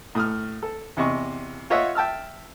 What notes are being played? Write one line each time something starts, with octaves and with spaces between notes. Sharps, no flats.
A2 D#6 F6
A4
E2 C3 D#5 C#6
F4 C#5 D#5 E5 F#5
E5 G5 A5 E6 F6